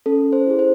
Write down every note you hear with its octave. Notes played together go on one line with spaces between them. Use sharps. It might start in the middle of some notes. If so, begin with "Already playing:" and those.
C#4 A4
C5
E4 G#4
C5